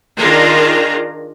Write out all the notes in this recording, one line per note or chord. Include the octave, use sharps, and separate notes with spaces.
D#3 D4 F4 G#4 A#5